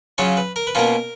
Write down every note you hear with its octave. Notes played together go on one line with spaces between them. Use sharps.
C#3 F#3 C#4 F4 C#5
B4
A#4
B4
B2 A#3 C#4 F4 A#4